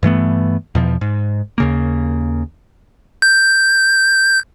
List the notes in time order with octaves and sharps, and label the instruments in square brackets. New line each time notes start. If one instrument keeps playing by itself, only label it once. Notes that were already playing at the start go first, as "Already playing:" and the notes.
[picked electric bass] G2 E3 A3 B3
E2 B2 F3
G#2
D#2 C#3 A#3
[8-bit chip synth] G6